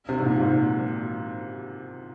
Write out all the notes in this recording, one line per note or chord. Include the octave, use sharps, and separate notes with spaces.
C3
G#2
A#2
G#2